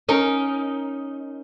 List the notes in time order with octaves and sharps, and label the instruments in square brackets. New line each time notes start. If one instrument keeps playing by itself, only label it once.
[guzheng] C#4 D#4 A#4